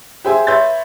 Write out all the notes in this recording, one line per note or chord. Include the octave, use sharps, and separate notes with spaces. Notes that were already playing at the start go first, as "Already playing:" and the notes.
G4 G#4 C5 E5 G#5
B4 C#5 E5 C6 G6 A6